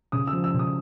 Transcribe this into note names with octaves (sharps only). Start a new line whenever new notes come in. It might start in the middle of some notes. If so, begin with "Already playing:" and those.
C#3 D#6
E6
F3
E6
C#3
D#6